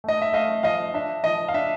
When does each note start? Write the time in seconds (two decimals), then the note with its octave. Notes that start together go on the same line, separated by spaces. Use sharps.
0.04 A3 D#5
0.22 E5
0.33 A3 D#5 F5
0.63 F3 D#5 F5
0.94 D4 E5
1.24 F3 D#5
1.48 F5
1.54 D4 E5